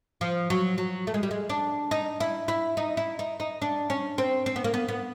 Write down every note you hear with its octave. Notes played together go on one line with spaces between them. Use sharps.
F3
F#3
F#3
A3
G#3
G3
G#3
D4
D#4
E4
E4
D#4
E4
D#4
D#4
D4
C#4
C4
C4
B3
A#3
B3
B3